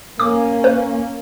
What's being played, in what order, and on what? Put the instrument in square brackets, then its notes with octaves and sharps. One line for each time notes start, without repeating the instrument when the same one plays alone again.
[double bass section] A#3 C#4 [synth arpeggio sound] D6
[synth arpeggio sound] B4